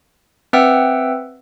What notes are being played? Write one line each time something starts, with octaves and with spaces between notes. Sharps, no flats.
C4 B4 E5 F#5 G5 E6